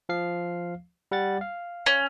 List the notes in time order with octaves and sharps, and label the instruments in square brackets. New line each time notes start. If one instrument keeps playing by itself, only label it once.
[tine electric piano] F3 F5 C7
G3 F#5 A6
F5
[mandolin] C#4